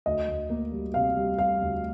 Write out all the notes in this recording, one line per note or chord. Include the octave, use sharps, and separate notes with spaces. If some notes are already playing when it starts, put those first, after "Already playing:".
D2 D#5
D2
A#3
G3
C3 F5
G3
G3 F5
D2